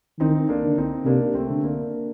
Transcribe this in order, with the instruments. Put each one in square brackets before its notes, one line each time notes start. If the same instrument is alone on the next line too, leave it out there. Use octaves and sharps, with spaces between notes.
[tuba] D#3 [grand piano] C4 D#4
[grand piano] A#3 D4
[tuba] D3
[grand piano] C4 D#4
[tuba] C3 [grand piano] A#3 D4
[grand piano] A3 C4
[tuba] D3
[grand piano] A#3 D4